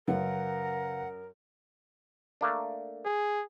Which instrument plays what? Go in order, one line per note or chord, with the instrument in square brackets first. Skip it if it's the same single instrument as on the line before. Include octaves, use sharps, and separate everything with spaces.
[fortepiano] F#2 [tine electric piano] C#3 B4 F5 [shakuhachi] A#4 [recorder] F#5
[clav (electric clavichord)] A3 A#3 D4
[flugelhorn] G#4